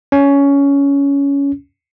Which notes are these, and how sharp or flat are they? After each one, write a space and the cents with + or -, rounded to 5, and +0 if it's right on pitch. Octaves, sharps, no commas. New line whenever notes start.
C#4 +15